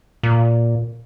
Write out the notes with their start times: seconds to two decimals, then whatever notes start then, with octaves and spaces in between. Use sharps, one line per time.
0.23 A#2